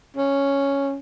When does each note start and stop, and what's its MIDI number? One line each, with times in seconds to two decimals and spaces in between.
0.17 0.98 61